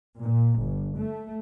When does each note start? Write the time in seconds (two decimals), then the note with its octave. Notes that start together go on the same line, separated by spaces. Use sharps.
0.20 A#2
0.58 G1
0.96 A3